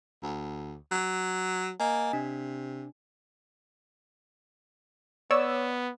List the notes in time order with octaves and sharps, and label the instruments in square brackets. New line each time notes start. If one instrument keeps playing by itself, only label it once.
[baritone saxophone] D2
F#3
[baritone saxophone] A#3 [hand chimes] D#5 G#5
[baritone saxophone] C3 [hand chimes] D4
[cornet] B3 [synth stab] C#5 D5 E6